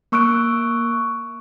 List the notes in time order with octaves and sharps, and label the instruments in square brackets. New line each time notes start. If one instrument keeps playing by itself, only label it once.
[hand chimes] A#3 C#6 E6 F#6 D7